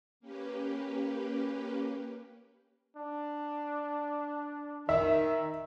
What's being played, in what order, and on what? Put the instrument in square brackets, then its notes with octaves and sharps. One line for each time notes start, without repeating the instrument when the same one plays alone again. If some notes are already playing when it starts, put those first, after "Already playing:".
[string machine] A#3 C#4 G4 B4
[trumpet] D4
[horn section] D#3 [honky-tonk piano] E5